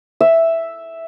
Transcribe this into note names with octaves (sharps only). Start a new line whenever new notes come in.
E5